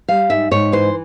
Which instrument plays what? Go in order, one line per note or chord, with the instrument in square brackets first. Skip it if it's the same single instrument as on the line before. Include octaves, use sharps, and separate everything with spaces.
[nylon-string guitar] G3 F5
G#2 E5
G#2 C#5
E3 C5